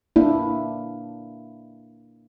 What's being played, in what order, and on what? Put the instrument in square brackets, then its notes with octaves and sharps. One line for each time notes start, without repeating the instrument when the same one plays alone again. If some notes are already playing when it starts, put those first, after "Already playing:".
[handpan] A#3 D4 E4